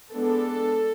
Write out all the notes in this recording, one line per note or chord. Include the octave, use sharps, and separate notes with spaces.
G#3 B3 D4 A4